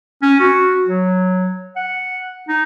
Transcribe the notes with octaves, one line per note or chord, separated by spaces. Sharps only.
C#4
F#4
F#3
F#5
D#4